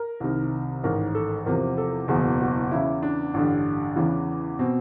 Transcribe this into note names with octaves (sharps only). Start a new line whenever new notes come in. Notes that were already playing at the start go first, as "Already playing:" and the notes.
Already playing: A#4
C2 C3 D#3
A1 G#2 D#3 A#4
A4
E2 C3 F3 A#4
A4
F#1 E2 B2 G#4
F#4
E2 C#3 E3 E4
D4
A1 G2 D3
E2 C#3 E3
B2 C4